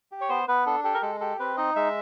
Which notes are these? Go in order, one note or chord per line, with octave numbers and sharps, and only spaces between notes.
G4
C#5
B3 C5
B3 B4
D4 A4
G4 A4
A#4
G#3 A4
G4 A4
C4 B4
D#4 D#5
G#3 E5